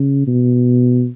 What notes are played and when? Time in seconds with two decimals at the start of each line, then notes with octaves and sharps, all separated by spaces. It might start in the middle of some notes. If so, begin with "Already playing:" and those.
Already playing: C#3
0.26 B2